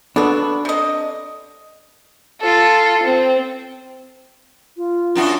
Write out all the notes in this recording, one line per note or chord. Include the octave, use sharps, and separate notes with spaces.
B3 D4 F#4 A4
C3 D#5
F4 A4
C4
F4
F#2 D4 F#4